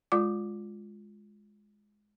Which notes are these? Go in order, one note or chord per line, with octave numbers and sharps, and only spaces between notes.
G#3 F4 D5 D6